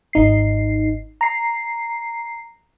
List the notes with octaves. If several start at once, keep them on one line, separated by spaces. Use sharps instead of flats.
G#1 D#4 C7
A#5 C7